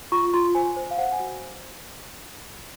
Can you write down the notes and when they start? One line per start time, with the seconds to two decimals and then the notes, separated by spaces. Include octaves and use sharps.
0.12 F4 C#6
0.34 F4 C6
0.55 C5 G#5
0.76 C5
0.91 F5
0.98 C5 F#5
1.12 G#5
1.20 F#4